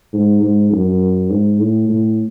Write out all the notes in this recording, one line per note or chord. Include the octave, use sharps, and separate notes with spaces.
G#2
G#2
F#2
G#2
A2
A2